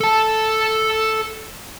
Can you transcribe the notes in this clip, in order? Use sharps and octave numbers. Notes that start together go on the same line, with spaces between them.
A4 A5